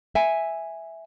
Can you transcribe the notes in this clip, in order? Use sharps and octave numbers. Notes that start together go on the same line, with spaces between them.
E5 G#5